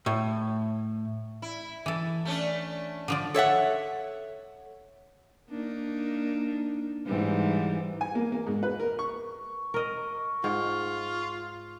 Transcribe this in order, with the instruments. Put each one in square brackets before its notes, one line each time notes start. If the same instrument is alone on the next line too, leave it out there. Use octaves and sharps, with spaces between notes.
[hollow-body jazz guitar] A2
[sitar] E4
[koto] E3 A4
[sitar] A3 C#4 D4
[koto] D3 F3 D5
[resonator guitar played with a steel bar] A4 C#5 E5 F#5
[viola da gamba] A#3 D4 D#4
G#2 E3 G3
[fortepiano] G#5
A#3
A#3
G#2
B4
A#4
C#6
[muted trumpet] C#6
[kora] A#4 D#5
[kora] G#2 [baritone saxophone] F4